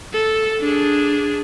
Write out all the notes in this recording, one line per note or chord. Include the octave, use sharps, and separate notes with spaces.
A4
D4 G#4